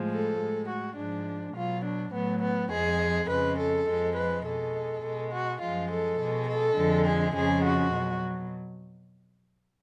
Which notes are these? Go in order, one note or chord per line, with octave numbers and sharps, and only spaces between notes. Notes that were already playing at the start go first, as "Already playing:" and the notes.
Already playing: A2 F3 G#3
A4
A2 G#3
F#4
G#2 F3 G#3 D4
B2 F#3 F4
D4
A2 F#3 B3
B3
F2 F3 G#3 G#4
F2 C#3 G#3 B4
A4
F2 F3 G#3
B4
B2 G#3 A4
B2 G#3
F#4
F#2 F3 G#3 F4
A4
B2 G#3
A4
F2 D3 F3 G#3
G#4
F2 C#3 F3 G#3 G#4
F#4
B2 F#3